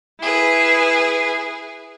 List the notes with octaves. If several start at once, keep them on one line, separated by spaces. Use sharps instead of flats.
E4 G#4 B4